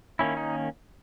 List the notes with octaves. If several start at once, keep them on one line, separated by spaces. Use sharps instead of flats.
D#3 A#3 C#4 E4
D#4